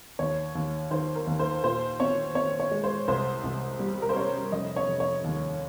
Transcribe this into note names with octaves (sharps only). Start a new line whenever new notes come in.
D#2 C#5
D#2
D#3 C5
A#4
D#2
C5
A#2 C5
C4 C#5
C4 C#5
C#5
G#3
C5
C2 C5
C2
G3
A#4
C5
C#4 C#5
F1 D#5
C#5
F1
C#5
D#2